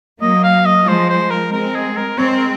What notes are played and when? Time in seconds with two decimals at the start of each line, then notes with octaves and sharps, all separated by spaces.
0.22 F#3 A#3 D#5
0.44 F5
0.66 D#5
0.88 F3 G#3 C5
1.09 C5
1.30 A#4
1.52 G#3 C4 A#4
1.75 G#4
1.97 A#4
2.18 G#3 C4 C#5
2.28 C5
2.36 A#4